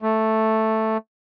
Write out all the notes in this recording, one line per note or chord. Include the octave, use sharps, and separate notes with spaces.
A3